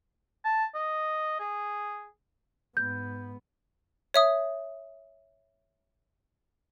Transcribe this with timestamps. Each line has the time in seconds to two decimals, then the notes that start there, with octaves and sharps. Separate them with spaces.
0.45 A5
0.75 D#5
1.40 G#4
2.77 G#2 B3 G6
4.14 C#5 E5 D#6